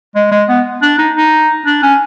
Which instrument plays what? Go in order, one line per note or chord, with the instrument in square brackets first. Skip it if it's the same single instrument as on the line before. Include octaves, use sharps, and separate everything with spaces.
[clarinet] G#3
G#3
B3
D4
D#4
D#4
D4
C#4